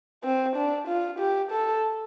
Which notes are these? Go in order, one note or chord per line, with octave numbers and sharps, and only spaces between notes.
C4
D4
F4
G4
A4